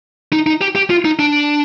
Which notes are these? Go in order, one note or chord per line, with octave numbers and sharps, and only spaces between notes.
D#4
D#4
G4
G4
F4
D#4
D4